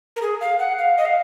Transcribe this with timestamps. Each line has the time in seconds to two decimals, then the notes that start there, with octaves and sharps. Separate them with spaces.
0.16 A#4
0.22 G#4
0.41 F5
0.59 F#5
0.79 F5
0.98 D#5
1.05 F5